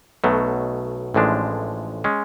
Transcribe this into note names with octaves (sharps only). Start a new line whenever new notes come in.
B1 B2 F#3 A3
A1 A2 F3 G#3 D4
G#3 C#4